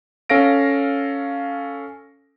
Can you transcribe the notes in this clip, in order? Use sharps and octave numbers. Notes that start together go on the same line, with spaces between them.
C#4 A4 F5 A#6 D7